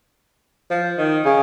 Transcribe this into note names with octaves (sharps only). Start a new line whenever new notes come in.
F3
D#3
C#3